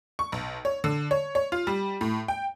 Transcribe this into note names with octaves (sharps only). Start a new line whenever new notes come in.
C#6
B1
C#5
D3
C#5
C#5
F4
G3
A2
G5